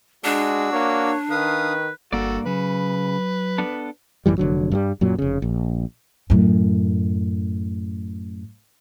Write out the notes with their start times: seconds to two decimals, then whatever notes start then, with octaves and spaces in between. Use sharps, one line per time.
0.24 G#3 D4 F#4 D5 E6
0.73 A#3 C#5
1.31 D#3 B4 F5 D#6
2.12 G1 G2 A#3 F#4 A4 D5
2.46 C#3 F#3 B4
3.58 B3 D4 A4
4.26 A1 F#2 E3 G3
4.38 F1 D3 F#3
4.72 G2 F#3 G3
5.01 F#2 A#2 F#3
5.19 F1 C#3
5.42 A#1
6.30 F#2 A2